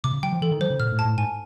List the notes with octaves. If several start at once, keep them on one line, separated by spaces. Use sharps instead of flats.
C3 D6
C#3
F#3 G5
F3
E3 A4
D#3
F#3 C5
C#3
A#2 F6
A2
A5
A2
G#2 G#5